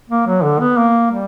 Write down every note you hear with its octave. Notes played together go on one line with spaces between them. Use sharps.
A#3
F#3
D3
B3
A#3
G3